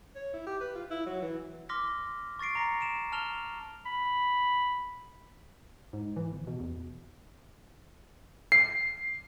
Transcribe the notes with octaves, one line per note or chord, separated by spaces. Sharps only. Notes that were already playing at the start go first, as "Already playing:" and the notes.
C#5
E4
G4
B4
F4
E4
F#3
E3
C6 D6 F6 A#6 B6
C#6 A6 A#6 C7 D7
A#5 A#6 C#7
D7 E7
A5 F6 F7 G7
B5
G#2
E3
G1
B2
E2
C7